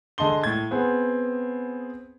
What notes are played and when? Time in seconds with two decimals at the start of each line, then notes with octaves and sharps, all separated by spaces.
0.18 D3 G#4 D#5 A5 C6 G7
0.44 A2 G#6
0.71 B3 C4 G#4